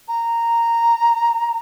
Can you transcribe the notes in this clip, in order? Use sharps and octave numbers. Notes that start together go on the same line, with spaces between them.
A#5